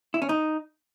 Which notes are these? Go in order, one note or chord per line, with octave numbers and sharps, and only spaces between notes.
E4
C#4
D#4